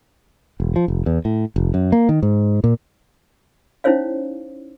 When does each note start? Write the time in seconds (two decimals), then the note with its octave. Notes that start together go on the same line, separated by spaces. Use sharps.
0.60 E1
0.76 F3
0.88 F1
1.06 E2
1.25 A2
1.56 F1
1.74 F#2
1.92 A#3
2.09 D#3
2.23 G#2
2.64 A#2
3.84 C#4 D#4 E4 C5 C#5 F5